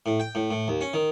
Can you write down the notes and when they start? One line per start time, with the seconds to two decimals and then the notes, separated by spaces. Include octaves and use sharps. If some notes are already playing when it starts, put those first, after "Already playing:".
0.06 A2
0.20 G5
0.35 A2
0.51 A2
0.68 D#2
0.81 C#4
0.94 D#3